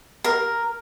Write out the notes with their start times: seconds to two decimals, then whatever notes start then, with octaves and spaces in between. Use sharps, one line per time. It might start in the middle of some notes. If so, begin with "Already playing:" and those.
0.24 A#4